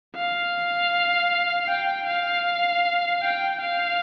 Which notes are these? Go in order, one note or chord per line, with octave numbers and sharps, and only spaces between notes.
F5
G5
F5
G5
F5